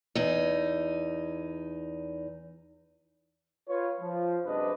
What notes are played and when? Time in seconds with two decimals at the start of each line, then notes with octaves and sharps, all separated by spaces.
0.15 E2 D#4
3.68 F4 B4 C#5
4.01 F3
4.44 F#2 C3 G#3 D4 B4 D#5